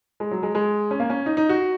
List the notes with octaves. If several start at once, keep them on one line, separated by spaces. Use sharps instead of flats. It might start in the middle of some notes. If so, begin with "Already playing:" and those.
G#3
F#3
G#3
G#3
C#4
A#3
C#4
D#4
D#4
F#4